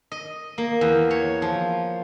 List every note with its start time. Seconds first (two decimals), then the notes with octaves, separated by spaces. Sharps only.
0.12 D#5
0.58 A#3
0.81 E2
1.11 C#5
1.42 F3